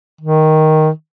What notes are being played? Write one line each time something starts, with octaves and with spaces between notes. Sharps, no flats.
D#3